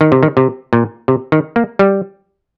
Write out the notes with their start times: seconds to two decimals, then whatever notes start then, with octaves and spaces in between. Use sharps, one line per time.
0.01 D#3
0.12 C3
0.23 D#3
0.37 C3
0.73 A#2
1.08 C3
1.32 D#3
1.56 A#3
1.79 G3